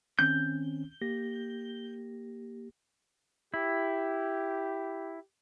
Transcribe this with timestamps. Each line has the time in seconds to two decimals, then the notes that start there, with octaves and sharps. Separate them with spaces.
0.19 D#3 C4 C#4 G6
1.02 A#3 G4 A#6
3.54 E4 G4